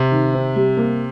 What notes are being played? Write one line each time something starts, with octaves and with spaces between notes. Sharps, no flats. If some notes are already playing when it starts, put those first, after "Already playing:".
Already playing: C3
D#3
C4
G3
A#3